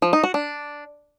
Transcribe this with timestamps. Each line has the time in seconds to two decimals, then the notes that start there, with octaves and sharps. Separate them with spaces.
0.02 F3
0.13 D#4
0.24 F#4
0.34 D4